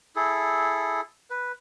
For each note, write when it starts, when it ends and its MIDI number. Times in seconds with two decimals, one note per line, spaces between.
0.16 1.01 64
0.16 1.01 68
0.16 1.01 69
1.30 1.52 71